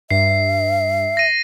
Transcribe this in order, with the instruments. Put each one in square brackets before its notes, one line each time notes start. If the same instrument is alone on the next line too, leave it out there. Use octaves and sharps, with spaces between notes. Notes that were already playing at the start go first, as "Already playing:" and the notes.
[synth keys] G2 [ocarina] E5 [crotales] C7
[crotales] A#6 D#7